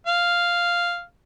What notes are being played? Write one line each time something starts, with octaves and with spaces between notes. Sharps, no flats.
F5